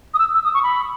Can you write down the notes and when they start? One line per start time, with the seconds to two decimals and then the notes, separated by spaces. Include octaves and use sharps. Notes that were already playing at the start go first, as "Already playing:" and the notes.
0.14 D#6
0.19 E6
0.34 E6
0.44 D#6
0.54 C#6
0.63 B5